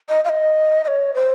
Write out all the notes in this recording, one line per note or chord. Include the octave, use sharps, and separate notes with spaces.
D#5
F5
D#5
D#5
C#5
C5